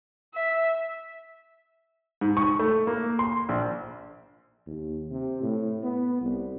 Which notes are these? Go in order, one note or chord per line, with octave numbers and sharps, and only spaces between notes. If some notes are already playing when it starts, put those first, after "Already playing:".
E5
G#2
C#6
A3
A#3
C6
A#1
D#2
C3
A2
B3
C2